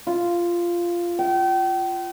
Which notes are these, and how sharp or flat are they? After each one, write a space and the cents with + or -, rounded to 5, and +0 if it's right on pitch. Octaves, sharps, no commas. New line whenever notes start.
F4 -10
G5 -35